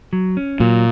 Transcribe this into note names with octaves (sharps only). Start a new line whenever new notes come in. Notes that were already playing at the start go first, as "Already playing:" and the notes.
F#3
C#4
A#2 F#3